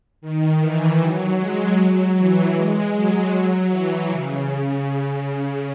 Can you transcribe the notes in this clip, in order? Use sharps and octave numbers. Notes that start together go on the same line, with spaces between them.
D#3
E3
F#3
G#3
F#3
E3
G#3
F#3
F#3
E3
C#3
C#3
C#3